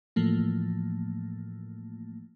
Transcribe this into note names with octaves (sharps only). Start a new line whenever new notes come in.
A2 E3 F3 A3 A#3